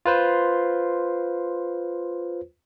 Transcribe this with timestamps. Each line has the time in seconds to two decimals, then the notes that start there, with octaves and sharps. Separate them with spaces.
0.06 F4 B4 C5